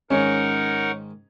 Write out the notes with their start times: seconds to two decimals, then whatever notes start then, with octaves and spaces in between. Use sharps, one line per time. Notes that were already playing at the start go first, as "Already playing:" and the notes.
0.10 G#2 D#3 C#4 D#4 A#4 F#5